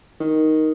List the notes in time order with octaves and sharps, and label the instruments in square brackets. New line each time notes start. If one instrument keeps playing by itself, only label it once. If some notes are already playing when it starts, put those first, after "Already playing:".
[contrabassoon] D#3